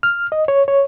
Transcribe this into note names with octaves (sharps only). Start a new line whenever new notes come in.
F6
D#5
C#5
C#5